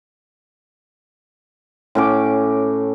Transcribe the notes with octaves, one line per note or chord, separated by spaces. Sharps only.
A2 C#4 D6